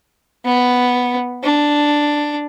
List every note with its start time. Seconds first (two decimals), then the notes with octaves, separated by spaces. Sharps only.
0.46 B3
1.43 D4